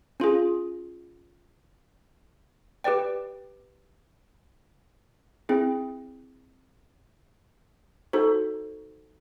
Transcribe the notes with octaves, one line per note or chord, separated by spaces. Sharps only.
C#4 F4 G#4
G4 B4 D5 G5
C4 E4 G#4
D#4 F#4 A4 C5